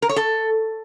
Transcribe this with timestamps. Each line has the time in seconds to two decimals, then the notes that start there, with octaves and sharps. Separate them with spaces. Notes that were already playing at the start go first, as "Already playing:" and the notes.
0.02 A#4
0.09 C#5
0.16 A4